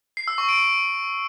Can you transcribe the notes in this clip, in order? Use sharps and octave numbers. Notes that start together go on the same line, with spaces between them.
C7
E6
C#6
D7